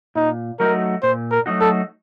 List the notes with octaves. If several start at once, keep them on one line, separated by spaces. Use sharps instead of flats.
A#2 D#4
F#3 A3 D#4 F#4 A#4
A#2 C5
A#4
F#3 A3 D#4 F#4
A4